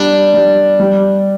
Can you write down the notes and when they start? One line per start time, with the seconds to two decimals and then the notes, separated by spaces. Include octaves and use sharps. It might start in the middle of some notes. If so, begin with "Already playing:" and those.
Already playing: G3 D4
0.34 G3
0.80 G3